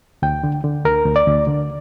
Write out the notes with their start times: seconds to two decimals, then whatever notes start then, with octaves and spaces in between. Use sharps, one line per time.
0.22 D2 G5
0.44 D3
0.64 D3
0.85 D2 A#4
1.06 D2
1.16 D5
1.27 D2
1.47 D3